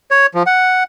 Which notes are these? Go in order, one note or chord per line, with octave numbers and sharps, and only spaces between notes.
C#5
F3
F#5